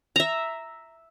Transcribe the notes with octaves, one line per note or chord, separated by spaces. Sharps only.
E5 A#5